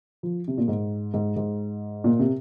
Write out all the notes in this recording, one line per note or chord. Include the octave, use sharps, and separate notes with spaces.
F3
C3
A#2
G#2
G#2
G#2
A#2
C3